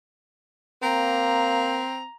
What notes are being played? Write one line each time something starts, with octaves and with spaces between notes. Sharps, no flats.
A#3 C4 A#5